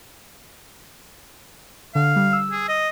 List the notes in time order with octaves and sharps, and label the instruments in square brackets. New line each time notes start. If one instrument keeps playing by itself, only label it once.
[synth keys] D3 [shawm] F5
[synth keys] G3
E6
[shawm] G#4
D#5